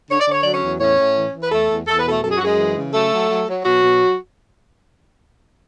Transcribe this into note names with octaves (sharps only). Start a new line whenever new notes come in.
D3 C#5
D5
D3 C#5
F#3 D5
C#4 C#5
E2
A2 C#4 C#5
A2
E3
E3
B4
E2 A3 A4
E2
E2 A4
B4
B2 A3 A4
F#2 A4
G#4
F#4
F#2 G#3 G#4
E3
C#3
F#3 A3 A4
F#3
F#3
F#3
B2 F#3 F#4
B2